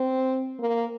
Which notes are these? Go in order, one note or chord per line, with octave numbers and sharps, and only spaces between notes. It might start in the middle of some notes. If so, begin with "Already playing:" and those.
Already playing: C4
A#3